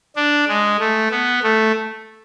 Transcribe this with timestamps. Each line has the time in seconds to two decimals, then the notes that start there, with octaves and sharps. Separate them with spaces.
0.16 D4
0.48 G#3
0.79 A3
1.11 B3
1.43 A3